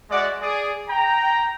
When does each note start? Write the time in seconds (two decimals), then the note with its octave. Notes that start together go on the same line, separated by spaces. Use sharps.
0.10 G#3 F#4 D5 E5 F#5
0.42 G#4 D5
0.88 G5 A#5